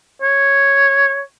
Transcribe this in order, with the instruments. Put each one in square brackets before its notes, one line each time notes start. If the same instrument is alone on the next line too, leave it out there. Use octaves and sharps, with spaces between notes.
[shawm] C#5